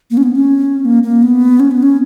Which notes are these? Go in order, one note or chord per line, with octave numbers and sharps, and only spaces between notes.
A#3
C#4
B3
C#4
A#3
A#3
B3
C#4
B3
C#4